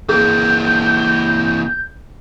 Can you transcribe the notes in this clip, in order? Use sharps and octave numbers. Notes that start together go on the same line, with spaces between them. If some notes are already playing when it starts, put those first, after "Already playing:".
E3 A#3 G#4 G6